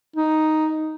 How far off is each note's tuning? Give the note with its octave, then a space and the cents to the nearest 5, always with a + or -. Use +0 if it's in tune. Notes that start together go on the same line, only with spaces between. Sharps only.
D#4 +0